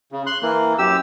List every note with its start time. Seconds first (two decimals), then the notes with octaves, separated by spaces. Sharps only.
0.12 C#3
0.26 C6 F#6
0.42 E3 A#3
0.78 F#2 G4 E6